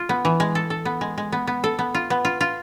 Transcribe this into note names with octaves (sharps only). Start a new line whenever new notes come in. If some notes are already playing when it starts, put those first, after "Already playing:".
Already playing: F4
B3
E3
G#3
A4
A4
B3
G#3
G#3
B3
B3
A4
B3
F4
B3
F4
F4